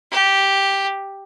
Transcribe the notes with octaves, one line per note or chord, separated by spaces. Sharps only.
G4